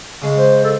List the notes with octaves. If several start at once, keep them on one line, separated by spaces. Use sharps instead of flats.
C#3 G#3
C5
A4